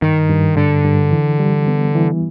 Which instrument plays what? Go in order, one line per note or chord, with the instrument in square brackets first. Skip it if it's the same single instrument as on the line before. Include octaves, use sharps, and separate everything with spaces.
[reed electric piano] G2 [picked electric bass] D#3
[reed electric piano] G2
[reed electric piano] G2 [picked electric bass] D3
[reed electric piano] G2
E3
G3
B3
E3